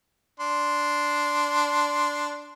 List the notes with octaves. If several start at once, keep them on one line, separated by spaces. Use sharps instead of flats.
D4 C6